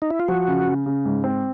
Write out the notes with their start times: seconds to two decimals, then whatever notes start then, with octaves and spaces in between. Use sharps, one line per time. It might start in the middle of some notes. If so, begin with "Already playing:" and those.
0.02 D#4
0.10 E4
0.20 F4
0.28 F3 F#4
0.48 C#3
0.67 C#3
0.86 C#3
1.05 G#2
1.24 C4